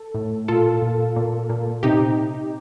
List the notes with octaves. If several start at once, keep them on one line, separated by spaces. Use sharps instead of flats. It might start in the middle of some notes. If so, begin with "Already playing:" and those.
Already playing: A4
A2
A#2 F4 A4
A#2
A#2
A#2
C3 D#4 G4